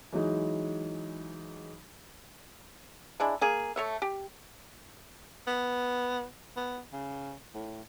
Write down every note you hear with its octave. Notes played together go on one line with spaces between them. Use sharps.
E3 F#3 G#3 D#4
G#3 D4 E4
A#3 G#4
A3 C#5 E5
G4
B3
B3
C#3
A2